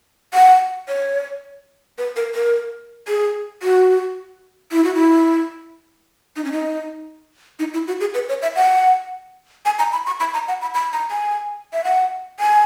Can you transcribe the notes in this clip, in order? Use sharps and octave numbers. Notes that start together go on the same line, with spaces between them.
F#5
C#5
B4
A#4
A#4
G#4
F#4
E4
F#4
E4
D#4
C#4
D#4
D#4
E4
F#4
G#4
B4
C#5
E5
F#5
G#5
A#5
B5
C#6
B5
A#5
F#5
B5
B5
A#5
G#5
E5
F#5
G#5